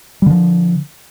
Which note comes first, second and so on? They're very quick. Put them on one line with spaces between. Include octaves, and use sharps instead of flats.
G3 D3 F3